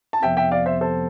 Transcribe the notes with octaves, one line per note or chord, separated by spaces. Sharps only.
A5
F2 C3 F3 B3 E5 G5
E5 G5
D5 F5
C5 E5
A4 C5